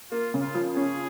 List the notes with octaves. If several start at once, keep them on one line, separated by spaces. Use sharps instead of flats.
A#3 F4
C#3
F4
F3
G#4
C#4